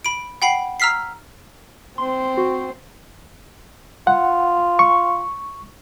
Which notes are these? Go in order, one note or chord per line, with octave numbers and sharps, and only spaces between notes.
B5 D7
F#5 G5 B5 C7
A#5 E6 F6 B6 C7
C4 C5 C6
F#4
F4 F#5
C#6